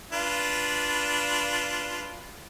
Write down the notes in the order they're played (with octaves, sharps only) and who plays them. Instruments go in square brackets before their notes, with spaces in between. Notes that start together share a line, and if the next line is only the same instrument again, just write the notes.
[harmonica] D4 F4 B4